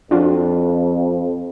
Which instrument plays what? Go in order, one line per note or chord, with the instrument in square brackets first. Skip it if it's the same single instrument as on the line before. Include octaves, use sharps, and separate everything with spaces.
[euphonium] F2 [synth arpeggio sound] D4 F4 F#4